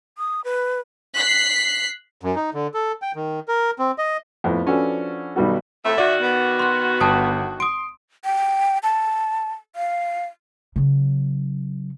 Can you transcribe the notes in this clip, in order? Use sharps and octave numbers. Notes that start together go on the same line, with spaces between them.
D#6
B4
F#6 B6 C7
F#2
D#4
D3
A4
G5
D#3
A#4
C4
D#5
F2 A2 B3
F3 C#4 D4 F#4 A4 B4
B1 D#3 G3 B3 F#4 A4
F2 A2 A3 E5
D#3 F#4 D5
B3
C6 F#6
G1 G5 A5 D#6
C6 D#6 D7
G5
A5
F5
C#3 F#3